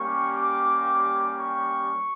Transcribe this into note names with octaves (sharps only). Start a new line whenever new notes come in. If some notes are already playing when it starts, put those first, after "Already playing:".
Already playing: G3 A#3 C#4 G4 C#6
D6
C#6